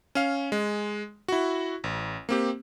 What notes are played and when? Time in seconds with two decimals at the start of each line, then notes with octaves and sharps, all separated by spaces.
0.15 C#4 F5
0.52 G#3
1.28 E4 F#4
1.84 A1
2.29 A#3 C4 G4